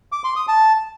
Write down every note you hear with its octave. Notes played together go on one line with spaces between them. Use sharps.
D6
C6
D#6
A5